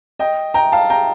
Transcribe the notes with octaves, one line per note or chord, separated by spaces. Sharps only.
D#5 G5
G5 A#5
F5 A5
G5 A#5